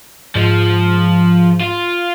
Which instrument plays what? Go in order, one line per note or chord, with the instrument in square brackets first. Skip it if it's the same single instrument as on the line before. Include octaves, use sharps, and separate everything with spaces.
[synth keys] G#2 [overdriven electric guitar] F3
[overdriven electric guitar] F4